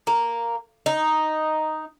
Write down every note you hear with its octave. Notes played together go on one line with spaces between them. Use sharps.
A#3
D#4